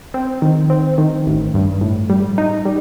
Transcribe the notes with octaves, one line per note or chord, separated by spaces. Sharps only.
C4
D#3
C4
D#3
A1
G2
A2
G3
D#4
G3